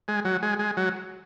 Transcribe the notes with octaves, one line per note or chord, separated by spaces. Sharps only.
G#3
F#3
G#3
G#3
F#3